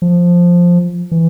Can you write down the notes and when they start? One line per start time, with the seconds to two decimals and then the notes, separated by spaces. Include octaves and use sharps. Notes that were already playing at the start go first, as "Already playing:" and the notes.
0.02 F3
1.11 E3